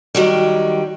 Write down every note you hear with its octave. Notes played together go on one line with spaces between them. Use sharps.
D#3 F#3 G3